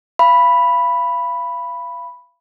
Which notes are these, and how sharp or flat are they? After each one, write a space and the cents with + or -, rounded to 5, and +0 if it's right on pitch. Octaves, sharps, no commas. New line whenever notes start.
F5 -35 B5 +0